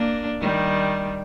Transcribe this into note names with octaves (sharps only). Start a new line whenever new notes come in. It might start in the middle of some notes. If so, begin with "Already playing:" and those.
Already playing: A#3 D4
D#3 G3